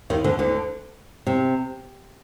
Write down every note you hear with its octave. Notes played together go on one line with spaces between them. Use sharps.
D#2 D#3
D2 D3
D2 D3
C3